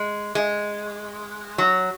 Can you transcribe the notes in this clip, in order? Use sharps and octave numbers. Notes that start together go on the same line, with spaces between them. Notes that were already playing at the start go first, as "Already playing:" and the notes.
Already playing: G#3
G#3
F#3